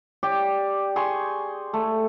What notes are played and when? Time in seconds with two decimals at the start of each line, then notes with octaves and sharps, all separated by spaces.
0.23 G4 D5
0.96 G#4 C6 C#6
1.74 A3